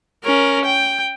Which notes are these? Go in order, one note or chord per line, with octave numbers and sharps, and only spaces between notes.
C#4 A#4
G5